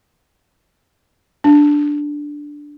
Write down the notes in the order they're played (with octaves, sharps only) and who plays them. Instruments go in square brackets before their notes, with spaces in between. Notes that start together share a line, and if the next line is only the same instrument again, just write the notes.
[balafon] D4